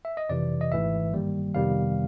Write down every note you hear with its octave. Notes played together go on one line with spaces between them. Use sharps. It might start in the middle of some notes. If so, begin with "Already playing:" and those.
E5
D#5
F2 C3 E3 D5
D#5
G#1 G#2 E3 A3 E5
G2 D#3 G3 A#3
F2 C3 D#3 G3 B3 F5